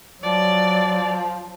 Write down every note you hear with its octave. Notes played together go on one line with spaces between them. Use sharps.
F3 F#3 D5